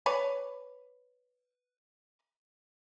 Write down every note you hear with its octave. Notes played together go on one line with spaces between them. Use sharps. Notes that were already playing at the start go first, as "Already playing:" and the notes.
B4 C#5 D5